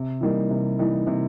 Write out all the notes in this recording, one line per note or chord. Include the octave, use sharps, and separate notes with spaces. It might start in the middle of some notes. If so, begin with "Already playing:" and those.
Already playing: C3
E3 G3 A#3 D#4
C3
E3 G3 A#3 D#4
C3